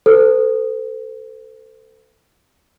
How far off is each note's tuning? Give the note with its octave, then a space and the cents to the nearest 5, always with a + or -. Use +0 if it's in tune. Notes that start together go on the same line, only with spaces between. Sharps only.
A4 +15 C5 -45